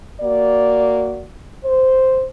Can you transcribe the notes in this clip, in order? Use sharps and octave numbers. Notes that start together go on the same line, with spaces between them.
A#3 F#4 D5
C5